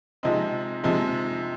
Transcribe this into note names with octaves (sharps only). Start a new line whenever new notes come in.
C3 F3 G#3 C4 D#4
C3 F3 G#3 C4 D#4